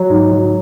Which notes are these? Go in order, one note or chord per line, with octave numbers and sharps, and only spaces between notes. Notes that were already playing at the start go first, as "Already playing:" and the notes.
Already playing: F#3
G#2
F#3